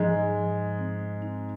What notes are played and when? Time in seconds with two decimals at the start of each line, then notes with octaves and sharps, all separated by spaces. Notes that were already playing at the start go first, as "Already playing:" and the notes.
Already playing: G#2 F3 G#3
0.36 F3
0.79 C4
1.22 D#4